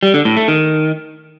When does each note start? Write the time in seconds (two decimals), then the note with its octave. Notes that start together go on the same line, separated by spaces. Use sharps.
0.03 G3
0.14 D3
0.25 A2
0.37 A3
0.48 D#3